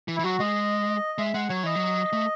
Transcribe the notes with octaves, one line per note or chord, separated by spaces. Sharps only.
E3
E4
E3
F#3 F#4
G#3 D#5
G#3 E5
G#3 F#5
F#3 C#5
E3 D#5
F#3
A3